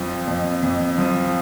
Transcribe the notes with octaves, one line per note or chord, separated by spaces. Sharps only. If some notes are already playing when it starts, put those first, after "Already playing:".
Already playing: F2 F3
F2
F2
F3